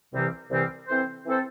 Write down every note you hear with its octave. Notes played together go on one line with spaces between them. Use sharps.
C2 C3 E3 G3 C4
C2 C3 E3 G3 C4
E3 C4 A4 C5
E3 C4 A4 C5